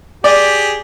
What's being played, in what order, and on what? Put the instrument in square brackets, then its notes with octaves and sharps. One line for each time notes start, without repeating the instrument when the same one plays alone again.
[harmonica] G4 G#4 [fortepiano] D5